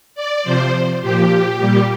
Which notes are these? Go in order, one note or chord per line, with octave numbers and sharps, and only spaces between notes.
D5
C3 F3 C5
A#2 F3 G4
A#2 G3